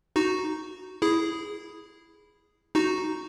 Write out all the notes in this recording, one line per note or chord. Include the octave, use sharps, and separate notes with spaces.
D#4 F#4
E4 G#4
D#4 F#4